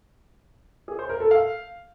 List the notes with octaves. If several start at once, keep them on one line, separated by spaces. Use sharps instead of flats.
G#4
C5
A#4
A4
F5